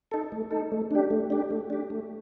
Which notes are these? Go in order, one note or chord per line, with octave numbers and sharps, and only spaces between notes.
D#4 A4
A3
D#4 A4
A3
D4 G4
A3
D4 G4
A3
D4 G4
A3